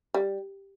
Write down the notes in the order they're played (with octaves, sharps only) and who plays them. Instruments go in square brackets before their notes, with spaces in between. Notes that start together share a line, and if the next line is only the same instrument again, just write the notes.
[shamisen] G3